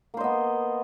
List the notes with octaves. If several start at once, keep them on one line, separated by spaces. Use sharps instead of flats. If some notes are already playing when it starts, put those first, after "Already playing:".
A#3 B3 C5 D#5